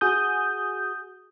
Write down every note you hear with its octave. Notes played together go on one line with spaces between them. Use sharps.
F#4 G#4 D#6 G6